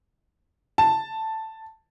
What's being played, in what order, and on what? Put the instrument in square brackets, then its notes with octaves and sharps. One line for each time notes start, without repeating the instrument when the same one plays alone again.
[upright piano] A5